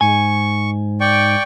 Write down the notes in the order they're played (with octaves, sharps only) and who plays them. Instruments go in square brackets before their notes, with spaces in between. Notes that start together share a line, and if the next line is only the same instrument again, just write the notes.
[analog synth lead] G#2 [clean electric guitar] G#5 [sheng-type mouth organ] C#6
[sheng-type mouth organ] D5 G5 C#6